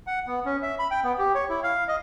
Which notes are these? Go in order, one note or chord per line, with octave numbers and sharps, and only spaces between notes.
F#5
B3
C#4
E5
B5
G5
B3
G4
C#5
E4
F5
D#5